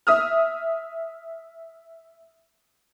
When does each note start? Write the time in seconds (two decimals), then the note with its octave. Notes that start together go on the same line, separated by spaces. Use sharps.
0.07 E5 D#6 F6